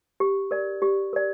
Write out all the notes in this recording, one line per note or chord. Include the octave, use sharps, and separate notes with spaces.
G4
A#4 D5
G4
A#4 D5